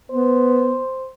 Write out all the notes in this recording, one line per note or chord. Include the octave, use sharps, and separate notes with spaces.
B3 C5